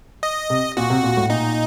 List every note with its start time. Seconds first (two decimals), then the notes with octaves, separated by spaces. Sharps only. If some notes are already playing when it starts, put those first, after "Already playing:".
0.23 D#5
0.50 C3
0.77 A#2 F#4
0.90 C3
1.03 A#2
1.17 A2
1.29 A#2 D#4